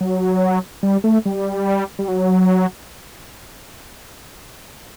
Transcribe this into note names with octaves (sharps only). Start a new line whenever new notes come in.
F#3
G3
A3
G3
G3
F#3